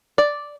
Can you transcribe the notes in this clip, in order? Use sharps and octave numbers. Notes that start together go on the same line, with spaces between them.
D5